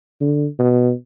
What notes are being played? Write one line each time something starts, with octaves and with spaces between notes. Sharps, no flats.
D3
B2